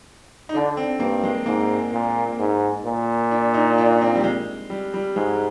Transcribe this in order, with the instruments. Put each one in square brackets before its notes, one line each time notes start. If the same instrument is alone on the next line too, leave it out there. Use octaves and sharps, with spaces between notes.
[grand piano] D#4
[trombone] D3 [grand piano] D4
[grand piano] C4
[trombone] G2 [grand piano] A#3
[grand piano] G#3
[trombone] G#2 [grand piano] A#3
[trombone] A#2
G#2
A#2
[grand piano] D4
D#4
D4
C4
G3
G#3
G3
G3
[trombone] G#2 [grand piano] G#3